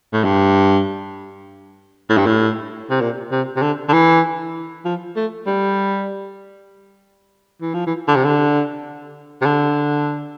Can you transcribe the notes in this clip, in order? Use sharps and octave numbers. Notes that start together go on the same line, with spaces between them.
A2
G2
A2
G2
A2
C3
A#2
C3
C3
D3
D3
E3
F3
A3
G3
E3
F3
E3
D3
C3
D3
C3
D3